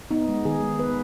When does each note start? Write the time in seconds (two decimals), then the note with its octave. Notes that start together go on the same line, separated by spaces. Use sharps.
0.11 B3 D#4
0.28 G#3
0.45 D#3 G#4
0.63 G#3
0.79 B3 B4